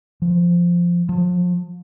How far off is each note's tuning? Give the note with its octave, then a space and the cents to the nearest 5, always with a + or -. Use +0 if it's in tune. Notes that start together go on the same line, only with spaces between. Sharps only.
F3 -5
F3 +35